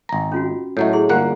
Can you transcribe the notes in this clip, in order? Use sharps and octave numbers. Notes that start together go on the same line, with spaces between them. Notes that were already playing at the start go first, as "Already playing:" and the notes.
G#1 A#5
C#4 F4 F#4
A2 F#3 A3 C#5 D#5
E4 G#4 C6
G1 A#3 F4 G4 D5 F#5